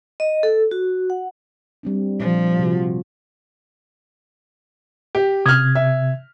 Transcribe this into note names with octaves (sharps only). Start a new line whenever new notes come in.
D#5
A4
F#4
F#5
G3 C4 D4
A#2 F3
C3 F4 F#4
G4
C3 D#6 F6 G#6
E5